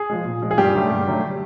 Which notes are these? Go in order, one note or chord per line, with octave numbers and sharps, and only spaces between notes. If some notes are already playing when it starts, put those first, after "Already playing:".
Already playing: G#4
F3 G#3
A#2
F3 G#3
G#4
G2 G3 G4
D3 F#3 A3
G2
D3 F#3 A3